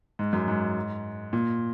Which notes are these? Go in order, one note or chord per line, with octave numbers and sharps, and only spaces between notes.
G#2
F#2
G#2
A#2